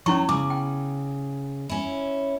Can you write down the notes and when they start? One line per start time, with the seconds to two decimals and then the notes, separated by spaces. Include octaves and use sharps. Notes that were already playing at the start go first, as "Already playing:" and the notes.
0.06 F#3 C#4 E4 C#6
0.29 C#3 D6
0.50 G5
1.69 C#4 E4